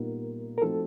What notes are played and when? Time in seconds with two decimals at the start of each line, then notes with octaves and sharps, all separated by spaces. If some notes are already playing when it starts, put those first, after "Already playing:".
Already playing: A#2 G3 B3 D#4 A#4
0.58 A#4
0.62 F3 A3 C4 D#4 F#4 A4